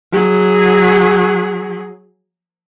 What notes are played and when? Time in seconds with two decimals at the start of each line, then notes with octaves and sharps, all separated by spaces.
0.12 F#3 G#4